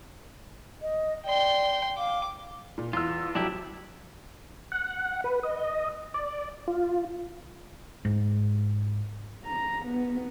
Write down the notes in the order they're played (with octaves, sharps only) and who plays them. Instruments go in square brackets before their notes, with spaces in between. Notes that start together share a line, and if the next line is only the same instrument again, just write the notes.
[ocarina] D#5
[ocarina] D5 [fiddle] G5 C6
[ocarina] F5 [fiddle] D6
[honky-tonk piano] A#2
[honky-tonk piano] E2 E6 [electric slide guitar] F4
[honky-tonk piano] F2 F#3 [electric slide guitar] D4 E4 G4
[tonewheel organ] F#5
B4
D#5
D5
F4
[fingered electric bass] G#2
[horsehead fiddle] A#5
B3